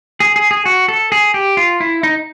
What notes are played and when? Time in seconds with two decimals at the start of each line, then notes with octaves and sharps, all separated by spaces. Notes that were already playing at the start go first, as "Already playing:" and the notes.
0.20 G#4
0.36 G#4
0.51 G#4
0.66 F#4
0.88 A4
1.12 G#4
1.34 G4
1.57 F4
1.80 E4
2.03 D#4